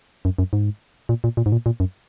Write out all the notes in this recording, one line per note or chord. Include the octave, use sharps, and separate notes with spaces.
F#2
F#2
G#2
A#2
A#2
A#2
G#2
A#2
A#2
F#2